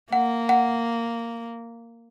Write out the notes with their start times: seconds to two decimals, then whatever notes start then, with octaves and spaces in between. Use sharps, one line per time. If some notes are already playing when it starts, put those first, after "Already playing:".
0.12 A#3 F#5
0.49 F#5